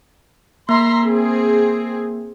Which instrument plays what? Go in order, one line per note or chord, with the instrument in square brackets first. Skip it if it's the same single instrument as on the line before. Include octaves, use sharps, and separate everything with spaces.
[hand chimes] A#3 [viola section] E5 A#5 C6
[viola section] C4 G#4